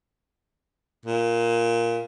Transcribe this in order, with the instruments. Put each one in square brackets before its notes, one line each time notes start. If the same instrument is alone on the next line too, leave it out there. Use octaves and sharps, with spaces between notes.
[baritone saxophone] A#2